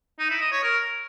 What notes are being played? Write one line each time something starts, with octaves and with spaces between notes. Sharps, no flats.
D#4
E4
D#5
C#5
A#4